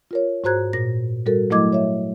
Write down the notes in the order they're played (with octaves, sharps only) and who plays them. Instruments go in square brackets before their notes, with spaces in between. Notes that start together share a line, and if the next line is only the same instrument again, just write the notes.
[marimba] F4 A#4 C#5
G#2 F#4 C5 A#5 F#6 G#6
A#2 A#6
G3 F#4 A4 A#4
F#3 A3 E4 D#5 D6 G#6
C#5 E5